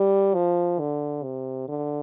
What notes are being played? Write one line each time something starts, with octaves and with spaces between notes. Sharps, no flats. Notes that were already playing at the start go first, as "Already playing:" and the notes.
Already playing: G3
F3
D3
C3
D3